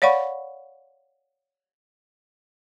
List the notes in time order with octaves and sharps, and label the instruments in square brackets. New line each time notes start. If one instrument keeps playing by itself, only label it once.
[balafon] C#5 D5 F5 F#5 B5 C#6